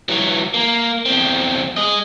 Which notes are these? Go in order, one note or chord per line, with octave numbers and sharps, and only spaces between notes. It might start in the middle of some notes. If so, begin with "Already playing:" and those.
E3 F#3
A#3
E2 C4
G#4 D#5